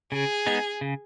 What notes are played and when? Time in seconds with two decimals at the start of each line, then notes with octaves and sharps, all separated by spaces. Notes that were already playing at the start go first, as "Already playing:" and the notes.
0.12 C#3 G#4
0.46 G#3 B3 D#4
0.81 C#3